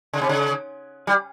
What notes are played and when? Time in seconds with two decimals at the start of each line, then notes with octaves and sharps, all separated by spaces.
0.13 C#3
0.21 C3
0.29 C#3
1.07 G3